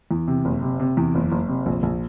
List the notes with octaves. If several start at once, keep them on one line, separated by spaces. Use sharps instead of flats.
E2
C3
F#1
C3
C3
E2
F#1
F#1
C3
A#1
A#1